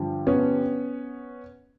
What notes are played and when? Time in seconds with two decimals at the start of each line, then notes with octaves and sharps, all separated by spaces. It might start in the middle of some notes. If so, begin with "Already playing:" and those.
Already playing: G2 D3 F3
0.27 B3 C#4